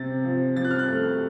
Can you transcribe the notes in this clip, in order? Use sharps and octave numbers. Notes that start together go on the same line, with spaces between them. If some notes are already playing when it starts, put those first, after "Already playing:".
Already playing: C3 A6
F3
F3 A6
F#6
F6
F#6
A3